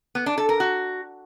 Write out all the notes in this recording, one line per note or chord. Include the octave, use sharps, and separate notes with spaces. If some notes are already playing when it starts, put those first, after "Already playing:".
B3
D4
A4
A#4
F#4